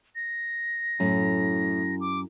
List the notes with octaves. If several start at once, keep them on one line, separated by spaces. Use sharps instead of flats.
A#6
F#2 A2
D6